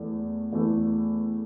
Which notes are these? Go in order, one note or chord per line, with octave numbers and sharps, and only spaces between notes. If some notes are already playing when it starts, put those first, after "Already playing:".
Already playing: E2 E3 A3
E2 E3 A3